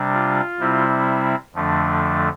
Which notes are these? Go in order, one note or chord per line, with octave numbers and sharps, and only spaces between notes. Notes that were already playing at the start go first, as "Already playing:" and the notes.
Already playing: C3 G3 D4
F4
C3 G3 C4 E4
F2 D3 F3 A3 D4